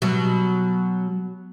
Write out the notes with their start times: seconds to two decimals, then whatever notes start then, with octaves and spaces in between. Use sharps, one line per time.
0.02 B2 F#3